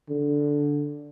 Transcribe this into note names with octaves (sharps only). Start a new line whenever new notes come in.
D3